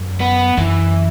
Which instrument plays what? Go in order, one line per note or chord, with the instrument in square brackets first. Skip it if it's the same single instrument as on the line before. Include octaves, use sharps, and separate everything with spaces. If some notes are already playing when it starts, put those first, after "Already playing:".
Already playing: [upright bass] F#2
[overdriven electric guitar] B3
[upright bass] F#2 [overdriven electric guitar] E3